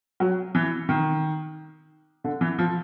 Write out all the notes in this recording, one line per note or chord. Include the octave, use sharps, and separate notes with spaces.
F#3
E3
D#3
D3
E3
F3